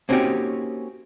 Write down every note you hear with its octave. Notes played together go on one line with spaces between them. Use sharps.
A#3 C4 C#4 D#4 F#4 G4